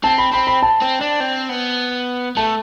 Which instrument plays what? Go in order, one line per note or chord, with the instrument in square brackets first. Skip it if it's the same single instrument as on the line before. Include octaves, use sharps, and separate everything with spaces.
[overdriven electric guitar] C4 [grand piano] A5
[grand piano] B5
[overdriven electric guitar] C4 [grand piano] B5
[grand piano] B5
A5
[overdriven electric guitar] C4
D4
C4
B3
[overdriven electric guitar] A3 [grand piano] A5